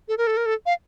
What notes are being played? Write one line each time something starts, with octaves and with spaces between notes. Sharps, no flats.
A4
A#4
A4
A#4
A4
F5